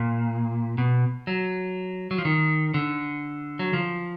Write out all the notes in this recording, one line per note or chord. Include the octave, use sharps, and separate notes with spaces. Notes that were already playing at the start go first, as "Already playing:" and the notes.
Already playing: A#2
B2
F#3
F#3
F3
D#3
D3
F#3
F3